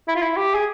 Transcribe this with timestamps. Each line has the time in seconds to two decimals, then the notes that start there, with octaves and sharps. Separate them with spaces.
0.08 E4
0.16 F4
0.22 E4
0.37 G4
0.54 G#4